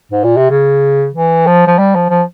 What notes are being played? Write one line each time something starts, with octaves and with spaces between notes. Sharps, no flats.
G#2
A#2
C3
C#3
E3
F3
F3
G3
F3
F3